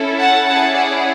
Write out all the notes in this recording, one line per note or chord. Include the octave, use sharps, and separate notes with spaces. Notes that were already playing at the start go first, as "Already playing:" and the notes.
Already playing: C#4 E4 A4
F#5 A5
C#4 E4 G#4 F#5 A5
D5 F#5